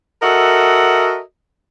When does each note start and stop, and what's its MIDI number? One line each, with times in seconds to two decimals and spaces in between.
0.22 1.19 66
0.22 1.19 69
0.22 1.19 70
0.22 1.19 75
0.22 1.19 76
0.22 1.19 78